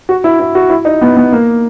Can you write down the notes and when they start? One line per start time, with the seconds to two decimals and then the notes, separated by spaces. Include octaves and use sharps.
0.09 F#4
0.24 E4
0.40 E4
0.55 F#4
0.70 E4
0.85 D#4
1.02 B3
1.17 B3
1.32 A#3